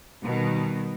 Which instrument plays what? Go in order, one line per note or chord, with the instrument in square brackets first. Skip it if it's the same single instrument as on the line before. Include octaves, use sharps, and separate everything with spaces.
[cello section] B2 D#3 G3